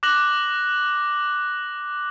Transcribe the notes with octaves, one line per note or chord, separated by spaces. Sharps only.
D6 F#6 A#6 F#7